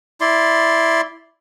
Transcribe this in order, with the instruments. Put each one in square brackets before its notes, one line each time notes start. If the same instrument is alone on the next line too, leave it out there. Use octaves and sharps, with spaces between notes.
[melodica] E4 D5 C6